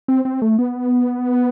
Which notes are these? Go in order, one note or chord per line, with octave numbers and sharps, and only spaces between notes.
C4
C4
A3
B3